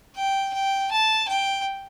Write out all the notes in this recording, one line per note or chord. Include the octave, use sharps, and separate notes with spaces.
G5
G5
A5
G5